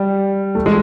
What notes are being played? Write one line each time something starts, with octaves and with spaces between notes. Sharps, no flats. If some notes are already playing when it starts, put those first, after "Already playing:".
Already playing: G3
A3
G#3